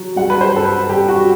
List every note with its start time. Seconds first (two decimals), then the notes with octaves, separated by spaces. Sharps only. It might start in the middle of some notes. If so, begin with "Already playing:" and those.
Already playing: F#3
0.16 G3 F#5
0.30 B4
0.41 C5
0.53 G2 A4
0.65 B4
0.89 G3 G4
1.09 F#4